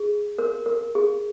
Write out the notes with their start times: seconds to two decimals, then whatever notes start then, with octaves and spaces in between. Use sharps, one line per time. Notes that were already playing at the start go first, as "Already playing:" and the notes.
Already playing: G#4
0.38 A#4
0.66 A#4
0.95 G#4